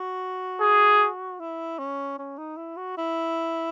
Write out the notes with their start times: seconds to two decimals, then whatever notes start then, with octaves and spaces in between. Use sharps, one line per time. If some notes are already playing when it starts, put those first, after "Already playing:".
Already playing: F#4
0.61 G#4
1.40 E4
1.79 C#4
2.19 C#4
2.38 D#4
2.57 E4
2.77 F#4
2.98 E4